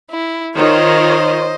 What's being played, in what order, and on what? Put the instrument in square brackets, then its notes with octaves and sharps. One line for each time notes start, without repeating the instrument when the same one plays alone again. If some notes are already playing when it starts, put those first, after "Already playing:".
[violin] E4
[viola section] D#3 F4 C#5 [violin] C5 D#5